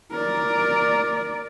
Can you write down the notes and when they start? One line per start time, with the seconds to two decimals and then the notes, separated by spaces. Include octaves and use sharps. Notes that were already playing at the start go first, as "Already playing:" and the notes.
0.11 A#4 D5